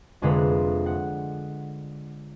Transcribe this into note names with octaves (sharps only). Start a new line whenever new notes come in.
F1 F2 D3 G#3 B4 A#5
F#5